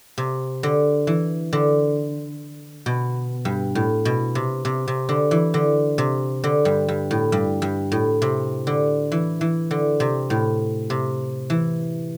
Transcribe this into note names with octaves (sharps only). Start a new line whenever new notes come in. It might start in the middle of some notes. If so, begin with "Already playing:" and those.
C3
D3
E3
D3
B2
G2
A2
B2
C3
C3
C3
D3
E3
D3
C3
D3
G2
G2
A2
G2
G2
A2
C3
D3
E3
E3
D3
C3
A2
C3
E3